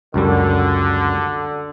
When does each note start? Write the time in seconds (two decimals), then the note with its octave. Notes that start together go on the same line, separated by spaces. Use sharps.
0.14 C#2 F#2 D3 G3